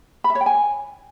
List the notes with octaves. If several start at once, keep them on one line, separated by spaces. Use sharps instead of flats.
B5
E5
C#5
G5
G#5